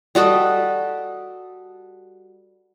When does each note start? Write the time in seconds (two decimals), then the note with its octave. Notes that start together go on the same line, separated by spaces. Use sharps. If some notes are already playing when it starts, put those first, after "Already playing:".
0.15 G3 F#4 A4 D#5